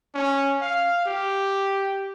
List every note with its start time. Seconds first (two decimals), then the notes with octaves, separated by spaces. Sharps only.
0.14 C#4
0.61 F5
1.06 G4